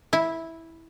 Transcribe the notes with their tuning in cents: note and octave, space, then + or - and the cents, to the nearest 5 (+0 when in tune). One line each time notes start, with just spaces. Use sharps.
E4 -10